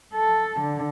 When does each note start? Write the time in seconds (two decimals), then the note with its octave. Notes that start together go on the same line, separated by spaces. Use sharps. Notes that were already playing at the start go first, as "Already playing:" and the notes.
0.13 A4
0.60 D3